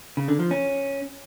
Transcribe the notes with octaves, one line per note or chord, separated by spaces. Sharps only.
C#3
D3
F3
C#4